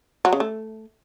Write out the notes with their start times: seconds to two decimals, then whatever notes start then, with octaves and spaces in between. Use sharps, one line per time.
0.25 F#3
0.33 C#3
0.40 A3